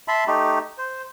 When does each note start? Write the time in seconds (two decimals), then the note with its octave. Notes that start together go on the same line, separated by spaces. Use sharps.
0.08 E5 A5 B5 C6
0.27 A3 D#4 G4
0.78 C5